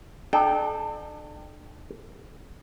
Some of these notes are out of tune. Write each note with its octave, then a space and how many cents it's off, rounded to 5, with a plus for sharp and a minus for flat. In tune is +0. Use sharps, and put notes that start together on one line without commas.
D4 +40 A4 -35 G5 +0